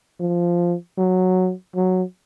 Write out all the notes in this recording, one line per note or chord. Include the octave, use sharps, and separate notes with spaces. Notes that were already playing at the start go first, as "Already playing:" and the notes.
F3
F#3
F#3